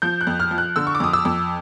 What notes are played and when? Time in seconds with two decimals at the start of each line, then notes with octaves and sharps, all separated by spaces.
0.02 F3 G6
0.21 F#6
0.27 F2
0.40 F6
0.51 F3
0.58 F#6
0.76 D3 E6
0.87 C#6
0.95 D6
1.00 F2 D#6
1.13 E6
1.25 F2